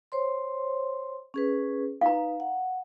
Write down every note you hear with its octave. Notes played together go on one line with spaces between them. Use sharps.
C5 C#5 C6
C#4 G#4 B4
D#4 B4 F5 A#5
F#5